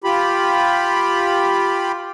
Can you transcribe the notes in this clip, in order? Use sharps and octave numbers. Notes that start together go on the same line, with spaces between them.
F4 G4 B5